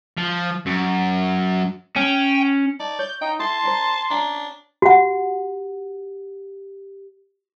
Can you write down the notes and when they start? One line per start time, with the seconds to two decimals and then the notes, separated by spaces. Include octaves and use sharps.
0.17 F3
0.66 F#2
1.96 C#4 G5
2.79 D#4 D5 A5
2.99 C#5 G6
3.21 D#4 G5
3.40 E4 A4 A5 C6
3.63 D4 A#4 C5
4.10 C#4 D4 G5 A#5
4.82 F#4 G4 F#5